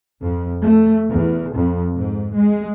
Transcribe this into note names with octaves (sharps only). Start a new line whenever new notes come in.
F2
A3
E2
F2
G#2
G#3